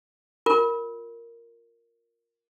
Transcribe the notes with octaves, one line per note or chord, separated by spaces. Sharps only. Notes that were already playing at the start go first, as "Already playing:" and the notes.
F4 A#4